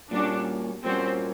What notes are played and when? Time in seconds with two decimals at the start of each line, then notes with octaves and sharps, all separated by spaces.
0.11 A#2 G3 A#3 C#4 D4 F#4
0.84 A#2 G3 A#3 C4 C#4 F#4